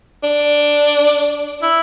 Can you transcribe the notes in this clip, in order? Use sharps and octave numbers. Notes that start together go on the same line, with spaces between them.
D4
E4